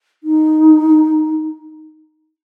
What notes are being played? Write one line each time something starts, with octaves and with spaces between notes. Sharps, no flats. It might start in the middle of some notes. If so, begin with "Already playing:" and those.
D#4